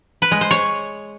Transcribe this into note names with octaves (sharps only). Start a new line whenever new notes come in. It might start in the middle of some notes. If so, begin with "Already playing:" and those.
B4
G#3
C5
C#5